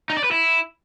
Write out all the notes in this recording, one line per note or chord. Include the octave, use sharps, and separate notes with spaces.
D#4
D5
B4
E4